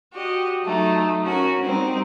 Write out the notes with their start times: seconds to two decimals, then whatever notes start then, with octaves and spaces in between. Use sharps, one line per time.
0.13 F#4 G4 D#5
0.63 F#3 A3 D#4
1.24 C#4 F#4 A#4
1.62 G3 C4 D#4